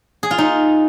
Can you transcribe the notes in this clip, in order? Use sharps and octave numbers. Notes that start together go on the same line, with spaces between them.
G#4
F4
D#4